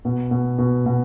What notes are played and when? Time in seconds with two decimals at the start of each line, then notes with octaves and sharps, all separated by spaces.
0.05 B2
0.31 B2
0.58 B2
0.86 B2